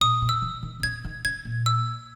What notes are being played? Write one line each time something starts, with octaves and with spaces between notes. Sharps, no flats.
A#2 D#6
B2
E6
E3
D#3
B2
C#3 G#6
D#3
C#3 G#6
A#2
E6